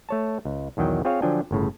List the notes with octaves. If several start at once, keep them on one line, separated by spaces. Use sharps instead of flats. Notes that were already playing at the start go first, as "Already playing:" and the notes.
A3 C#5 A5
C#2
B1 E2 D#3 F#3 G5
C4 F4 G#4 C5 C#5 F5
D3 F3 F#3 D4 G5 G#5
G1 A2 C#3